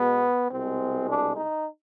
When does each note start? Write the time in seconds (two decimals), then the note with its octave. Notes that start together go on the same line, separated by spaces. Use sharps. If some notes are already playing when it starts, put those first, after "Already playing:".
Already playing: B2 G#3 B3
0.51 C2 B2 G#3 C4
1.07 D4
1.36 D#4